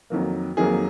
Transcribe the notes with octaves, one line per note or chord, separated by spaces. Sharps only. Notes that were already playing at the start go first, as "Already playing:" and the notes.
F2 D#3 F#3 A#3
F2 D#3 F#3 A#3 G#4